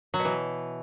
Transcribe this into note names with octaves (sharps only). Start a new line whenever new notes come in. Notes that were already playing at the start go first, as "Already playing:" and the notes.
F#3
B2
E3